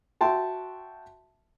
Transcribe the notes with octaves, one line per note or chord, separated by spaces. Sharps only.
F#4 E5 G5 A5 C6